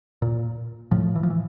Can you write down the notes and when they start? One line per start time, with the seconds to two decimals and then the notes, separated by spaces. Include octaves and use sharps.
0.22 A#2
0.91 A2 F3
1.15 E3
1.23 F3
1.30 E3